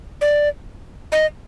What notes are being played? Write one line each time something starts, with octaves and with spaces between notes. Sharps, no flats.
D5
D#5